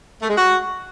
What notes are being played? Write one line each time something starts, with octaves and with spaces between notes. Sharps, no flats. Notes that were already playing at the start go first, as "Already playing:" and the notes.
A3
G#3
F#4